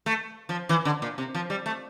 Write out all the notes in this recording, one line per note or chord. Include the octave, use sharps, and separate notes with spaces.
A3
F3
E3
D3
A#2
C3
F3
G3
A3